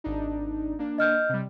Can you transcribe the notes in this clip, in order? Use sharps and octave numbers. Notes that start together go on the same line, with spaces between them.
G#1 D4 D#4
A#3 D4
D#5 F6 G6
C3 G3